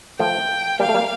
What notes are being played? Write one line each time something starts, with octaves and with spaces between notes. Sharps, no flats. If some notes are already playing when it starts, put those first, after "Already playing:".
F3 A3 G5
G3 A#3 F5
A3
G3 A#3